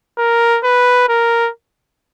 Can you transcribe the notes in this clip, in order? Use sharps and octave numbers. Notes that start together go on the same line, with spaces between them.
A#4
B4
A#4